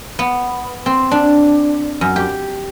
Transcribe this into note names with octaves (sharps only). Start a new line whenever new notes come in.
B3
C4
D4
F#2
G4